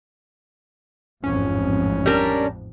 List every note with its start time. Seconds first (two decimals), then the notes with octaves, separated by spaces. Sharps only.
1.24 A1 F2 G#2 C#4
2.06 G3 D4 A#4